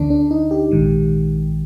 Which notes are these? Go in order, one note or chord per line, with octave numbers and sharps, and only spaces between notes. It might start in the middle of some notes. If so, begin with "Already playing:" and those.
Already playing: D2 D3 D4
D4
D#4
G4
A#1 G#2 D#3